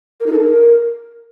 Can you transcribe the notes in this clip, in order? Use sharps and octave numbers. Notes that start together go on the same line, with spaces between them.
A#4
D#4
A4
A#4